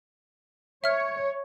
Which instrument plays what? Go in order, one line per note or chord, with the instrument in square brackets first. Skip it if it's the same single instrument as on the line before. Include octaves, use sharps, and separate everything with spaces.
[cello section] C#5 [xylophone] E5 F6